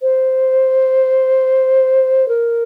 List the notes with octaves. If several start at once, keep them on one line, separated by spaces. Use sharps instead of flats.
C5
A#4